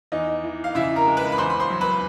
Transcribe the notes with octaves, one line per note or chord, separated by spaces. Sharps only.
E2 D#4 D#5
E3
F5
C#3 E4 E5
A#4 A#5
G#3
B4 B5
B5
E2 C5 C6
B5
C5 C6
F#3
B4 B5